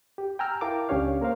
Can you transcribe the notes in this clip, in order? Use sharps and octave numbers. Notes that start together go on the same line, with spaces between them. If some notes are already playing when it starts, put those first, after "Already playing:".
G4
G5 G#5 A#5 E6 F6
E4 A#4 F5 G5 A5 D6
C#2 C#4 D4 G4 C#5 F5
A#3 A#4 C5 F5